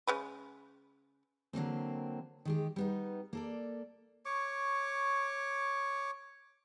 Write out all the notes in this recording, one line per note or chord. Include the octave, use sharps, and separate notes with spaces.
C#3 G#3 B4
D3 F#3 A#3 C4
D#3 G#3 G4
G3 B3 D#4
A#3 A4 D5
C#5 C#6 D6